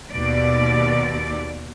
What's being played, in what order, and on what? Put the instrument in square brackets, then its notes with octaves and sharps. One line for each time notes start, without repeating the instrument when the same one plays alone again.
[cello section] D#2 B2 D5